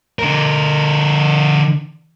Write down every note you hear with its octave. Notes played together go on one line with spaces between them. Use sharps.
D3 A#4